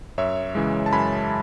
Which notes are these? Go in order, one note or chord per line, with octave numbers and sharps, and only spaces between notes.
F#2 C#5 E5
C#3 E3 G#3
A5
F#2 G#5 B5